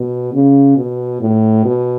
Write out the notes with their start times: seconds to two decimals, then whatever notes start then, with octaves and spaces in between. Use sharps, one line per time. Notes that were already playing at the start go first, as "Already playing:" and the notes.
Already playing: B2
0.33 C#3
0.77 B2
1.21 A2
1.65 B2